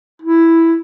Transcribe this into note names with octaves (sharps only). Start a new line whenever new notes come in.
E4